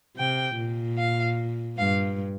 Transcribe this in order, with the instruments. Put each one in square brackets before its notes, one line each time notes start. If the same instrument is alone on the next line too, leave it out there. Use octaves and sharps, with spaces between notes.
[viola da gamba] C3 [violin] G5
[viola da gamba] A#2
[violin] F5
[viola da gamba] G2 [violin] F5